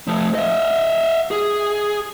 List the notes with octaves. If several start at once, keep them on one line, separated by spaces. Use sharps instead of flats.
F3 A3
D#5 E5
G#4